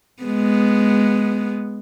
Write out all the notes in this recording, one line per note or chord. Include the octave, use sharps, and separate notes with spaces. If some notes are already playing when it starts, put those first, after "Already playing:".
G#3 B3